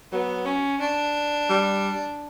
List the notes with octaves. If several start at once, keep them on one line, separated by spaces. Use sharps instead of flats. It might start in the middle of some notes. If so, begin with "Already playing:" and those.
F#3 B3
C#4
D4
G3